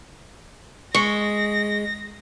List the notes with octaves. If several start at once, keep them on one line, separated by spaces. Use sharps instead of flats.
G#3 C#6 A#6